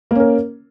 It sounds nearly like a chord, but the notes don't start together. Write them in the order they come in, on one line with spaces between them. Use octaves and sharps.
A#3 C#4 A#4